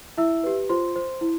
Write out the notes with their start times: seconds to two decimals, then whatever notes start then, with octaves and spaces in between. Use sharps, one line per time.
0.17 E4 E5 E6
0.44 G4 B4
0.69 F4 C5 C6
0.96 C5
1.21 E4